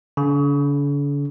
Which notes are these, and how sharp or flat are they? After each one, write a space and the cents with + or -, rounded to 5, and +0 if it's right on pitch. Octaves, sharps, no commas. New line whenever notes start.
D3 -45